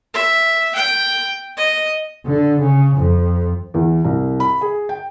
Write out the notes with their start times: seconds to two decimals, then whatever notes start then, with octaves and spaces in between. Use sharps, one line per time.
0.14 E5
0.75 G5
1.56 D#5
2.26 D3
2.60 C#3
2.97 F2
3.74 E2
4.05 C2
4.40 B5
4.61 G#4
4.89 G5